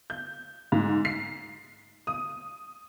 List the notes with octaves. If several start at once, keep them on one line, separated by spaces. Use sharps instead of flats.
G6
G#2
C7
D#6